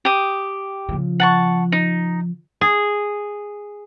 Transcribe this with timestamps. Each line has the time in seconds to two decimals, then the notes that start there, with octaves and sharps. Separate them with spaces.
0.05 G4 D#6
0.89 C#3 F3
1.20 F#5 A5 C#6
1.72 D#4
2.61 G#4